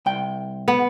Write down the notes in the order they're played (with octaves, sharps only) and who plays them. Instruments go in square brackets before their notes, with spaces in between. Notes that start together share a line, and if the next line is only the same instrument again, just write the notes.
[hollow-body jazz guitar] C2 G5
[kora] B3